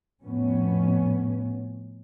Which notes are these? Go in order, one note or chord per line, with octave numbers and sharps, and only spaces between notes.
F2 A2 B3 C#4